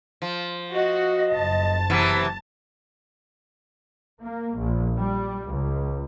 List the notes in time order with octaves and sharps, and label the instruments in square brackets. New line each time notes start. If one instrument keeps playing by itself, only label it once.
[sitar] F3
[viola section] F#4 [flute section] D#5
[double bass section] F#1 [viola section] A5
[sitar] C3 E3 B3
[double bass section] A#3
A#1
G3
C#2